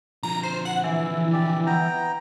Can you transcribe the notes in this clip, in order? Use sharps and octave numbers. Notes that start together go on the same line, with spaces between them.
D3 F3 A#5
C5
F#5
E3
G4 D5
B3 G5 A#5